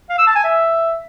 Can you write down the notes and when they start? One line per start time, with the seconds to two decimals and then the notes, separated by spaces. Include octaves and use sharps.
0.10 F5
0.18 E6
0.27 A5
0.35 G#5
0.44 E5